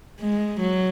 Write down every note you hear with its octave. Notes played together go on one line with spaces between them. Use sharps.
G#3
F#3